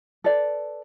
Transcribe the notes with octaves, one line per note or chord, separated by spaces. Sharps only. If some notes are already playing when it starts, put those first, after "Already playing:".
A4 B4 D5